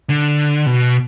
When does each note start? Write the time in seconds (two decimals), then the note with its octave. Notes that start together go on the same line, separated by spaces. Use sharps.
0.10 D3
0.66 B2